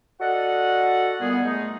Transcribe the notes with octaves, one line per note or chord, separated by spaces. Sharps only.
F#4 A4 D5 D#5 F#5
A#2 G3 B3 G#4
G#3 A3 D#4